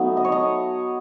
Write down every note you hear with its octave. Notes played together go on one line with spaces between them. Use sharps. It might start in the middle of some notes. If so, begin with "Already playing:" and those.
Already playing: F#3 A3 B3 D#4
D#5
C#5
D#5